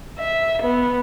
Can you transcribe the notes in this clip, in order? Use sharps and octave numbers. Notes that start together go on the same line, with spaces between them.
E5
B3